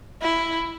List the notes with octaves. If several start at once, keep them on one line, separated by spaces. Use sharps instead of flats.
E4